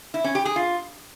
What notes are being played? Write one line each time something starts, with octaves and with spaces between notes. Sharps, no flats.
E4
C#4
G4
G#4
F4